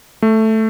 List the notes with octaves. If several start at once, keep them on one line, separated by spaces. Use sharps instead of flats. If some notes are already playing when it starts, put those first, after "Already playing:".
A3